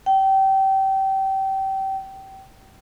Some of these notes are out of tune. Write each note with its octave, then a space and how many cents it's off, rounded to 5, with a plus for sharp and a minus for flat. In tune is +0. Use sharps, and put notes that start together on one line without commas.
G5 -25